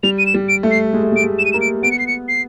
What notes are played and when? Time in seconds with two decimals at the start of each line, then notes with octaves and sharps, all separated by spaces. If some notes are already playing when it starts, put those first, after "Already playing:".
0.03 G3 F7
0.18 D#7
0.26 E7
0.34 G3
0.49 D7
0.63 A3
0.71 C7
0.93 G#3
1.03 A3
1.12 G#3 D7
1.24 A3
1.39 E7
1.45 D#7
1.52 A#3 E7
1.61 D7
1.83 B3 D7
1.92 C#7
1.99 C7
2.07 C#7
2.28 C7